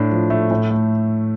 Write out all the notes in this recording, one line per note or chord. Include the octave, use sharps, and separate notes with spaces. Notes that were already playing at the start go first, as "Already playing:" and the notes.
Already playing: A2 D4
F3
A3
A2
A3